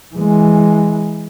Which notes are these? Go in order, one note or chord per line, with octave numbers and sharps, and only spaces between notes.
E3 G#3